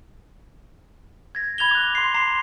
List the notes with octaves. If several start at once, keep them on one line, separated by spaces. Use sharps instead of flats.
G#6 A#6
B5 G#6 F7 G7
D6 F#6
C6 C7
A#5 C6 C7